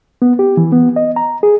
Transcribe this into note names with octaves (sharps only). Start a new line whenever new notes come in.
B3
G4
E3
B3
D#5
A#5
G#4